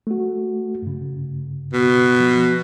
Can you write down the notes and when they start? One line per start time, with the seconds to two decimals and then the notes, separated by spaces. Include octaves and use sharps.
0.07 A3 F#4
0.82 G2 C#3
1.73 B2
2.20 F3